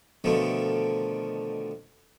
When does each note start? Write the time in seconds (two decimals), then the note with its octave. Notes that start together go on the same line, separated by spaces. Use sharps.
0.24 B2 D3 D#3 F3 A3